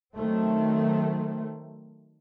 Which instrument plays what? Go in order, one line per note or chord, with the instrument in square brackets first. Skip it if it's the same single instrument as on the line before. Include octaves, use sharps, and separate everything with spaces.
[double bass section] D#3 F#3 A3 C4